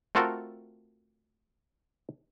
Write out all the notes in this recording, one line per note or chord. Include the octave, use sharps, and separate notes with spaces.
A3 C4 F4 F#4 A4 A#4